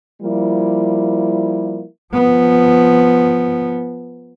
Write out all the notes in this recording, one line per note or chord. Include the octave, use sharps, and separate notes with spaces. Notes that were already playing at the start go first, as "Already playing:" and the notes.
F3 G3 A#3 E4
F3 B3